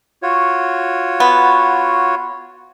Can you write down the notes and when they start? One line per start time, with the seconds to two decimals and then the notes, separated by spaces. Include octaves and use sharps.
0.23 F4 F#4 C#5
1.20 B3